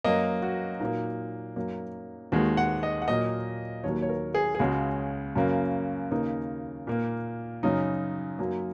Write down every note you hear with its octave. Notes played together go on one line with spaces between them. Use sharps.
F#2 F#3 A#3 D#5
F#4
A#2 F#3 A#3 D#4
F#2 F#3 A#3
D#2 D#3 G#3 F#4
F#5
D#5
F#5
A#2 F#3 A#3 D#5
D#2 D#3 F#3 A#3 C#5
C#5
A#4
G#4
G#4
C#2 C#3 G#3 F#4
F#2 C#3 A#3
D#2 C#3 A#3 D#4
A#2 A#3
F#2 C#3 F#3 D#4
F#2 F#3 A#3